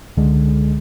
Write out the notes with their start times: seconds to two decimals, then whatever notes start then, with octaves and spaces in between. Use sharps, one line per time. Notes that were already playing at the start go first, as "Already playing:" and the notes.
0.17 C#2 D3 G#3